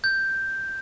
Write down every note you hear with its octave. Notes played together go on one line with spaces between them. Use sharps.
G6